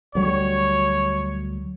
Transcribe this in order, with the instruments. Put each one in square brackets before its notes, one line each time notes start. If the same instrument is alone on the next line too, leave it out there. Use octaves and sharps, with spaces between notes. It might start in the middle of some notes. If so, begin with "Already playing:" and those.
[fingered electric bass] D2 F#3 G3 [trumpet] C#5